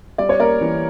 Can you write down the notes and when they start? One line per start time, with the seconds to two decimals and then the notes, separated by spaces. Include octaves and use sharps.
0.18 G3 D5
0.29 C#5
0.39 A#3 A#4 D5
0.61 E3